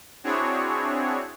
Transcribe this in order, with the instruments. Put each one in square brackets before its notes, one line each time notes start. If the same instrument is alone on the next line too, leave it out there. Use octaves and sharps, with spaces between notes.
[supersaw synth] C4 D4 E4 F#4 G#4 C#5